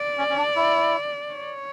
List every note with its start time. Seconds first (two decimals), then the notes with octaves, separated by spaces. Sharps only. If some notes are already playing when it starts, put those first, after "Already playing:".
Already playing: D5
0.18 C#4
0.30 C#4
0.37 D4
0.56 E4
1.33 C#5